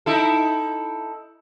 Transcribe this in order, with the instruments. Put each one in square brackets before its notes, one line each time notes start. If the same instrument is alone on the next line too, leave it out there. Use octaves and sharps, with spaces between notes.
[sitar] D#4 E4 A4